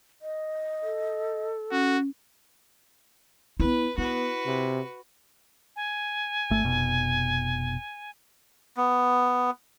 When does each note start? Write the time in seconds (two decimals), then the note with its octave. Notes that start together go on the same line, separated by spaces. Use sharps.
0.22 D#5
0.83 A4
1.71 C#4 F#4
3.60 B3 E4 B4
3.98 B3 E4 F#4 B4
4.47 C3
5.76 G#5
6.50 G#1 A3
6.64 F1 B2
8.77 B3